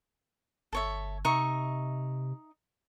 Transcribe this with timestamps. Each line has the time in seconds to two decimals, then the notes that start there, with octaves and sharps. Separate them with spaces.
0.73 G1 A4 C#5 E5
1.25 C3 D#4 E5 C#6